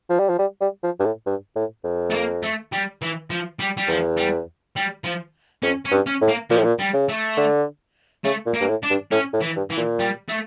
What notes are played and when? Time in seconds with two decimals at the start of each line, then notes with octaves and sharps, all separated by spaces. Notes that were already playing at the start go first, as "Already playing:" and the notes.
0.10 F3
0.20 G3
0.29 F3
0.39 G3
0.61 G3
0.84 F3
1.00 G2
1.05 A2
1.26 G2
1.56 A2
1.84 F2
2.10 A3
2.14 A#3
2.43 A3
2.72 G3
3.02 E3
3.30 F3
3.59 G3
3.77 G3
3.88 E2 F3
4.17 G3
4.76 G3
5.04 F3
5.63 F2 C#4
5.85 C#4
5.92 G2
6.06 C#4
6.22 A2
6.28 A#3
6.50 A#2 F3
6.58 A2
6.64 A#2
6.79 G3
6.94 C#3
7.09 A3
7.37 D3
8.25 C#3 A3
8.46 A#2
8.54 A#3
8.61 G2
8.69 A2
8.83 D4
8.90 G2
9.12 A2 C#4
9.33 A2
9.41 E3
9.56 G2
9.70 E3
9.77 A#2
9.99 G3
10.28 A3